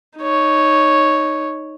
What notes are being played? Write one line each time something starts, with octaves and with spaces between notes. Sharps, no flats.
D#4 C#5